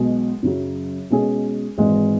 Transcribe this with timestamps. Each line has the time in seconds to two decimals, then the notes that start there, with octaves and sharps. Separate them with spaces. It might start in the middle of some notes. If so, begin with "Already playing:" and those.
Already playing: B1 B2 G#3
0.43 F#2 C#3 F#3
1.10 B2 G#3 C#4 G#4
1.78 G#1 G#2 E3 G#3